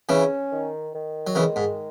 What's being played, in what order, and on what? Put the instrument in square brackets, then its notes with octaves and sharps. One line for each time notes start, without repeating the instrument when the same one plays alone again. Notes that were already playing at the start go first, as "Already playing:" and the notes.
[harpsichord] C#3 E3 [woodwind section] C#4
[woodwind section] D#3
D#3
[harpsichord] F#3
[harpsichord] C#3 E3 [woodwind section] G#3
[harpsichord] G#2